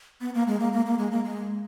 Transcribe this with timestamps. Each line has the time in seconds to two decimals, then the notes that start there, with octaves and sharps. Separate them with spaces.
0.21 B3
0.34 A#3
0.47 G#3
0.60 A#3
0.73 A#3
0.86 A#3
0.99 G#3
1.11 A#3
1.24 G#3